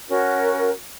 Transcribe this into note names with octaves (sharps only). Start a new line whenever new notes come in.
C#4 F#4 A#4